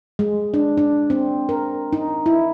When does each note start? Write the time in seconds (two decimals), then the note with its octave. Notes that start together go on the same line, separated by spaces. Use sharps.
0.19 G#3
0.54 D4
0.77 D4
1.10 C4
1.49 A#4
1.93 D#4
2.26 E4